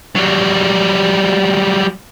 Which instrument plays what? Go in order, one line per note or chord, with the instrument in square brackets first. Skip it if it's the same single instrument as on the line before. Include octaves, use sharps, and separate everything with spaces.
[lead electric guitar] F#3 G3